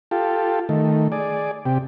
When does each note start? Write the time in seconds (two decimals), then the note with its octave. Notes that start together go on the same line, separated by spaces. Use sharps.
0.11 F4 G4 A4
0.69 D#3 A3
1.12 G#4 D5
1.66 C3 G4